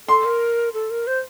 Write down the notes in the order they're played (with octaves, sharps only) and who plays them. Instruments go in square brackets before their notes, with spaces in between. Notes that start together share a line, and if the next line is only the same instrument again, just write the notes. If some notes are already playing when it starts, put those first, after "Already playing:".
[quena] A4 [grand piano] C6
[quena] A#4
A4
A#4
C5